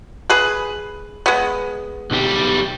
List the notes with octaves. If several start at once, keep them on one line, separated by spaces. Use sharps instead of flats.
G#4 B4
G#3 B3
B1 G3